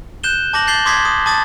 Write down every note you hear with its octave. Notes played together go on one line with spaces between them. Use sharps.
F#6 G6 E7 G7
A5 D6 G6 A#6 F#7
G6 A6 C7 F#7 G7
C6 D6 D#6 G#6 B6 C7
D#6
A5 D6 D#6 A6